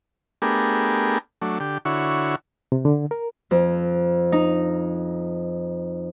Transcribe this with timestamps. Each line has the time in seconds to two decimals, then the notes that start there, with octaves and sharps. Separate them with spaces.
0.42 A3 B3 D4 G4 G#4 A#4
1.42 F#3 A3 D4
1.60 D3 G4
1.85 D3 E4 F#4 C#5
2.72 C3
2.85 D3
3.11 A#4
3.51 F2
4.32 D#4